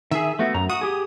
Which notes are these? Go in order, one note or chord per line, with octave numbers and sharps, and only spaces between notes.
D#3 G#4 E5
A3 B3 F#4
F#2 A#5
F#4 D#6
G4 G#4